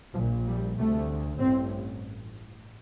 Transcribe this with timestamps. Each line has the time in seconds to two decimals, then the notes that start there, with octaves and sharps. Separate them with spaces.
0.14 A#1 F3
0.20 A#2
0.45 G3
0.77 D2 C3 A3
1.39 A1 G2 C4